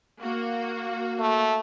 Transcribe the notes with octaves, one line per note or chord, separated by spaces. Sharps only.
A#3 F#4
A3